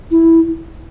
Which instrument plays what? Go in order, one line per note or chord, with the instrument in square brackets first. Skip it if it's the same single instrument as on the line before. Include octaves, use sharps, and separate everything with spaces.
[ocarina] E4